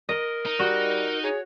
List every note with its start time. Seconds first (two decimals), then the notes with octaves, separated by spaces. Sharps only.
0.09 A#4 D#5
0.46 D#4
0.59 G3 F#4
1.23 G#4 C#5